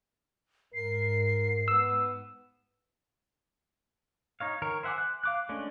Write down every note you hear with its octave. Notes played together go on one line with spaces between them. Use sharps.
G#2 A#4 C7
B3 E6
D#4 C#5 F5
D#3 A#4 C#5
C5 E5 F#5 G#5 D6
F#6
F5 D6 F#6
G#3 A3 C#4 D4